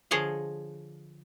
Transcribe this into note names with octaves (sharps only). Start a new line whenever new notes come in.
D3 F3 G#4 C#5 D#5 F5